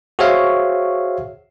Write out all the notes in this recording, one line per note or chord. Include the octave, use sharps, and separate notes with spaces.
F#4 G#4 C5 C#5 E5 F5